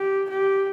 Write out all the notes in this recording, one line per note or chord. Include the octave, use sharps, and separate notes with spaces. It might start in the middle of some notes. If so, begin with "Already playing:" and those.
Already playing: G4
G4